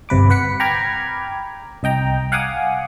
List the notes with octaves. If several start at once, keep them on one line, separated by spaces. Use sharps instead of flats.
G1 C3 B4 D6
B4 F#5 B6 C#7
G5 A#5 B5 D6 F6 G#6
C2 D#5 G5 A#5
F5 F#5 G#5 D6 D#6